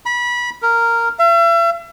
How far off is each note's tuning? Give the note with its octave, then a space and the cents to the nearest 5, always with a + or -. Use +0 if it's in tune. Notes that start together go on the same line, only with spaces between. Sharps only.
B5 -25
A#4 -10
E5 +40